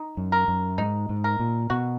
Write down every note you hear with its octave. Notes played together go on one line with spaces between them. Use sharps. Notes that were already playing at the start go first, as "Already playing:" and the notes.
Already playing: D#4
F#2
A#4
F#2
G#2 D#4
G#2
A#4
A#2
B2 F#4